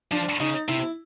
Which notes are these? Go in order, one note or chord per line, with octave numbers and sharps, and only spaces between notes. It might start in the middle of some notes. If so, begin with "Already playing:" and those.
F3 D4
C#3 D#4
C3 E4